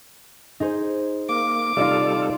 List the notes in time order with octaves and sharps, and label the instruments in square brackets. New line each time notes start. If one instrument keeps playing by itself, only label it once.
[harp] D#4 G#4 C5
[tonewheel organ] A#3 [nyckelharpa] D6
[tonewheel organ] C3 G3 A4 [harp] D#4 D#5 F5 [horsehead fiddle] F4 D5